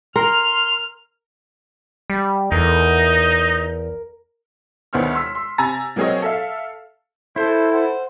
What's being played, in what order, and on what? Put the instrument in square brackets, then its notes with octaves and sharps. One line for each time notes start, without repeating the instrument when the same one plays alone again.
[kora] A#4 [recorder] C6 [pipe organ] F6
[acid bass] G3
[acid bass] E2 [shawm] D#4 [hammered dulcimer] A#4
[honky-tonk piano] D2 D#3 B3 C5 C#5 F6
C6 E6 B6
C6
C3 G#5 A#5 E6 A6
F#3 A#3 C4 G#4 C#5 D#5
A4 E5 F5
[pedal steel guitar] E4 [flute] A4 [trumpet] C5
[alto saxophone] C5 [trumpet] F#5